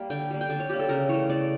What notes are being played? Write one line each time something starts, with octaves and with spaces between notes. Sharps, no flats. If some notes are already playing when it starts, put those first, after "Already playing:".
Already playing: G3 A#3
D3 G5
G3 A#3
G5
D3 A5
C#5
G3 A#3 G4
A4
C#3 A#4
E3 A3 C#5
C#3 D5